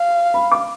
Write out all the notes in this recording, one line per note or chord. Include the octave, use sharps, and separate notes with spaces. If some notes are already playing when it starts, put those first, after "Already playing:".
Already playing: F5
B5
D6